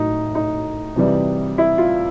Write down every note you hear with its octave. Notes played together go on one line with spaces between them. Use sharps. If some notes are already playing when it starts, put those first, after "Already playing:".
Already playing: A2 F#3 D#4
D#4
C3 E3 G3
E4
F4